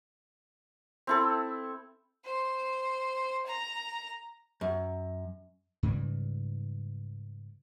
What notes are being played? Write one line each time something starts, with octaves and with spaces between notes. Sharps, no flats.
C4 E4 A4
C5
A#5
F#2
G#2 C#3 E3 G3